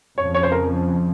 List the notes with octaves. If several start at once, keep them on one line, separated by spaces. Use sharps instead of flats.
F2 C#3 F3 C#5
C#5
C5
A#4